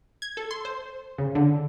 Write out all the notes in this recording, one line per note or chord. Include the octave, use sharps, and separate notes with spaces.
G#6
A4
C6
C5
C#3
D3